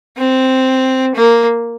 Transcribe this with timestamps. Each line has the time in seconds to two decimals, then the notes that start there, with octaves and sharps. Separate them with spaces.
0.17 C4
1.15 A#3